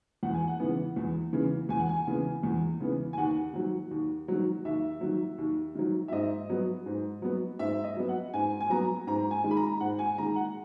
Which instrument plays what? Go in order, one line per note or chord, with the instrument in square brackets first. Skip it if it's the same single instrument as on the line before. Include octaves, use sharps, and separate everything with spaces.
[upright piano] E2 F#5
G#5
F#5
C#3 E3 B3
E2
C#3 E3 B3
E2 G#5
F#5
G#5
C#3 E3 B3
E2
C#3 E3 B3
G#5
D#2 F#5
D#3 F#3
D#2
D#3 F#3
D#2 E5
D#3 F#3
D#2
D#3 F#3
E5
G#2 D#5
F#3 B3
G#2
F#3 B3
G#2 E5
D#5
F#3 B3
F#5
G#2 G#5
G#5
F#3 B3 A#5
G#2 A#5
G#5
D#3 G#3
B5
A#5
G#2 F#5
G#5
D#3 G#3 A#5
F#5